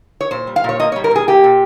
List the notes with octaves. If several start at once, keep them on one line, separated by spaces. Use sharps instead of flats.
C#5
A#2 C5
G3
F5
A#2 C#5
A#3 D#5
C#5
G3
A#4
A#2 G#4
A#3 G4
A#2